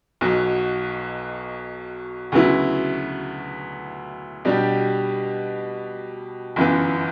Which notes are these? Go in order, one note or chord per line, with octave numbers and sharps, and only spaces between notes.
B1 B2 F#3
D2 C#3 F#3 B3 E4
B2 G3 D4 G4
G1 F#2 E3 B3